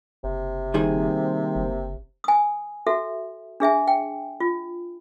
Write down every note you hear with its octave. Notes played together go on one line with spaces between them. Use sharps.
F#1 C3
D#3 G3 A#3 C4 G#4
F#1
G#5 D#6
F#4 A4 E5
D4 G#4 E5 G#5
G5
F4